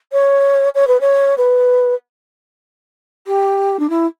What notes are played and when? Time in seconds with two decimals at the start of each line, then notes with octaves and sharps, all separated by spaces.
0.12 C#5
0.75 C#5
0.87 B4
1.01 C#5
1.37 B4
3.27 G4
3.79 D4
3.89 E4